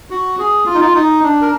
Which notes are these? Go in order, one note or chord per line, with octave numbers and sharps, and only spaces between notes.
F#4
G#4
F4
D#4
F4
D#4
D4
A#4